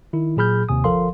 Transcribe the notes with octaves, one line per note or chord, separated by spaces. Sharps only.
D#3 E4
A#2 F#3 G#4 B5 F6 G6
D#2 C3 G#5 D#6
G1 F3 A4 A#4 F5 C6